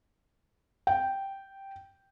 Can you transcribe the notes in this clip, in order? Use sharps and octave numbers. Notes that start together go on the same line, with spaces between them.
G5